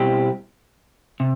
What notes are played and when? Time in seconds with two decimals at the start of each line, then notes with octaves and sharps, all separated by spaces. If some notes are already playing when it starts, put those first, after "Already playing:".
Already playing: B2 G3 C4 E4 G4
1.20 C3